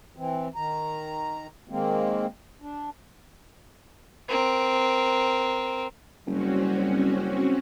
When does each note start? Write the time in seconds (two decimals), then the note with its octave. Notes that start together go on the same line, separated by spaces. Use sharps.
0.16 E3 C4
0.55 D#3 A#5
1.69 D#3 G#3 A#3 C4
2.61 D4
4.28 C4 A#4
6.27 F#1 G3 C4 C#4 F#4